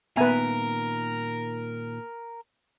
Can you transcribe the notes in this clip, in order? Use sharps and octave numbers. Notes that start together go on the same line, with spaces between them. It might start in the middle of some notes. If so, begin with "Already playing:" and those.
A#2 D#3 B3 A#4 B4 E5 G#5